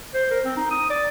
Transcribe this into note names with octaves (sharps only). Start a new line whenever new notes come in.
C5
A#4
C4
D#4
D#6
D5